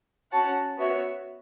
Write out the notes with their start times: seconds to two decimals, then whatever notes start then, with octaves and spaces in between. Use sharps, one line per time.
0.32 C#4 F#4 C#5 F#5 A5
0.77 B3 F#4 C#5 E5